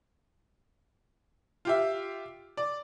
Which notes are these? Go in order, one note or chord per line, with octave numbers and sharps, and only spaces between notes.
F4 G4 E5
D5